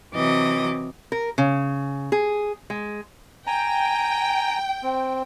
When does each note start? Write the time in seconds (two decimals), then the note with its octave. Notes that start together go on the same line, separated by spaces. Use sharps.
0.14 C3 E3 F#3 D#5 D6
1.12 A#4
1.38 C#3
2.12 G#4
2.70 G#3
3.47 G5 G#5 A#5
4.83 C4